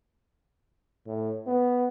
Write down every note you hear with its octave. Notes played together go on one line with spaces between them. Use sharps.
A2
B3